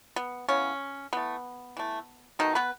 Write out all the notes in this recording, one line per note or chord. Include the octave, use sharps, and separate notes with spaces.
B3
C#3 E3 B3 C#4
E3 A3 B3
E3 A3
B2 D#3 A3 D#4
B3 B4